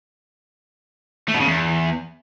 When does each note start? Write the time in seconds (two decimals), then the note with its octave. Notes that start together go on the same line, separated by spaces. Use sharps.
1.28 A3
1.34 B2
1.40 C#3
1.46 E2